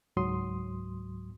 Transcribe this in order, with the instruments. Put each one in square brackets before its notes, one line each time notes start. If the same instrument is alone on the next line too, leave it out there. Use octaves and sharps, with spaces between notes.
[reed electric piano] C#2 G#2 F#3 C6 D#6